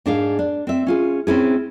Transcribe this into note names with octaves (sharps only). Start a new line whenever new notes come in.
G#2 D4 G#4 F5
D4
C4 E5
C#4 F4 G#4
C4 C#4 E4 G#4